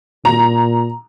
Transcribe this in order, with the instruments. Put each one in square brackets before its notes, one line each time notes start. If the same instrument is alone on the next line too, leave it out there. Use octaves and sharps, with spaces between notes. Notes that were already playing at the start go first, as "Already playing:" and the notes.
[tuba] A#2 [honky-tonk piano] A#5